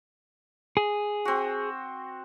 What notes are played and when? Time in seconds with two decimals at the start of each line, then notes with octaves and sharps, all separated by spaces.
0.77 G#4
1.25 C4 F#4